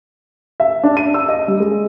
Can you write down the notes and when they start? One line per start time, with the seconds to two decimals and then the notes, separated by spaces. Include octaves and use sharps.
0.60 E5
0.83 D4
0.97 D#7
1.14 E6
1.29 D#5
1.48 G3
1.60 G#3